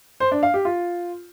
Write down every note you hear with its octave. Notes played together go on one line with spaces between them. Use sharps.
C5
D4
F5
G4
F4